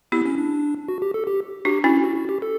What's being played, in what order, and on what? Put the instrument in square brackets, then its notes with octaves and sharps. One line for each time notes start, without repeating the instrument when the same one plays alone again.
[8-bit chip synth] B3 [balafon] E4 G4
[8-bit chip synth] C#4
D4
F#4
G4
A4
G4
[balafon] D4 F#4 [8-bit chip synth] G4
[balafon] C#4 E4 [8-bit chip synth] F#4
[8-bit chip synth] F#4
F#4
G4
A4